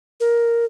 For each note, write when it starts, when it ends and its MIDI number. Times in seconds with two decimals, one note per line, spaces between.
0.20 0.65 70